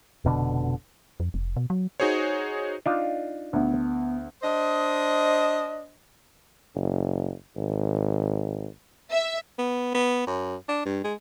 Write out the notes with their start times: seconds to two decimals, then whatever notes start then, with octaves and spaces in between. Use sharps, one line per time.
0.25 F1 B2 D3
1.20 F2
1.34 F1
1.57 B2
1.70 F#3
2.00 D#4 F#4 G#4 C5 C#5
2.86 D4 D#4 F4
3.53 D2 B3
4.42 D4 C5 D#5
6.75 F#1
7.57 G#1
9.11 E5
9.59 B3
9.94 B3
10.27 F#2
10.69 D4
10.86 G2
11.04 G#3